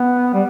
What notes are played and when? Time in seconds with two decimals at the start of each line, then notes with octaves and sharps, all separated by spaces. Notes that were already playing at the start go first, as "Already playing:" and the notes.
Already playing: B3
0.34 G3